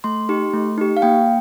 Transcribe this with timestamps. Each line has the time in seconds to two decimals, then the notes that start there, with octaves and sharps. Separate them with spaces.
0.04 A3 C6
0.29 D#4 G4
0.54 A3
0.78 D#4 G4
0.97 F5
1.02 A#3 G5